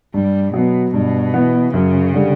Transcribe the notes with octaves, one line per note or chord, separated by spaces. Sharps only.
G2 G3
B2 F#3 B3
G2 B2
E3 B3
F#2 C#3
D3 G3